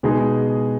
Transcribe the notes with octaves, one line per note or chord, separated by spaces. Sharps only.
B2 G#3 B3 D#4 G#4